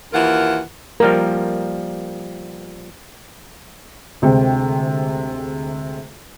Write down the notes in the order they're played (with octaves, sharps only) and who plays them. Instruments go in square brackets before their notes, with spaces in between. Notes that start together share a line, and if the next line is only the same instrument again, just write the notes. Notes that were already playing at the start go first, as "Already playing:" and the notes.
[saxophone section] D#2 E3 E4 F4 A#4 F#5
[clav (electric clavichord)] F3 G3 A#3 [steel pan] A#4
[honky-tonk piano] D2 C3 G#3 G5